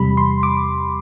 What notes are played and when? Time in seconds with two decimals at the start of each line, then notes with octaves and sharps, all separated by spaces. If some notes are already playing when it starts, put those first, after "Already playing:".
Already playing: E2 C3 G3 B5
0.17 C6
0.43 D6